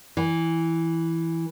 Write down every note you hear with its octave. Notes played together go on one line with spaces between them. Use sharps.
E3